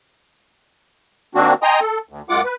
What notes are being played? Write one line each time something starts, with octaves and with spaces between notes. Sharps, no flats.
D#3 A#3 C4 D4 F#4
D#5 G5 G#5 A#5 C6 D#6
A4
D2
F#2 G#3 F4 F#5 D6
B4